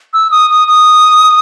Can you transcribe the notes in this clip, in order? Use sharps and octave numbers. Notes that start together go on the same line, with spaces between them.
E6
D#6
D#6
D#6